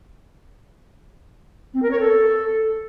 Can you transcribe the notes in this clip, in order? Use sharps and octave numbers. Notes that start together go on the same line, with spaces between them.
C4
A#4
C#5
A4